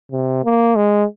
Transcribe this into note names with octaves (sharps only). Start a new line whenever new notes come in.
C3
A#3
G#3